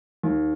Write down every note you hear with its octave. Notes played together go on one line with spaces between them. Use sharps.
D#2